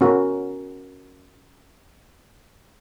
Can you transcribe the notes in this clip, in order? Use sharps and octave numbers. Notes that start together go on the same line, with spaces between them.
C#4 F#4 A#4